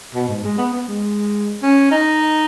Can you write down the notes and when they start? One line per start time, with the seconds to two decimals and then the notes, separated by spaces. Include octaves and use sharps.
0.15 B2
0.28 G#2
0.44 G#3
0.58 B3
0.73 B3
0.88 G#3
1.62 C#4
1.91 D#4